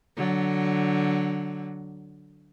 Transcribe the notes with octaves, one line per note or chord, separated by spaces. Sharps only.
D3 F#3